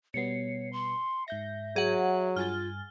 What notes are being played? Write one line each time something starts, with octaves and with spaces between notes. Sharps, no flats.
B2 G3 B3 C#5 C7 C#7
C6
G#2 E5 G6 A#6
F#3 G#4 F#5
G2 F4 G#5 F6 A6 G7